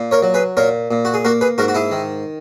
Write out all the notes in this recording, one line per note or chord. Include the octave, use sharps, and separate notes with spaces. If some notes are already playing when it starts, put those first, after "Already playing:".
Already playing: A#2
A#4 C#5
F#3
G#4 B4
A#2 A#4 C#5
A#2
F#4
G#4
A#3 F#4 A#4
G#4 B4
G#2 F#4 A#4
F#4
E4 G#4
D#3